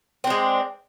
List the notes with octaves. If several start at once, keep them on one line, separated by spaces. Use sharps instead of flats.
G#3 C4 D4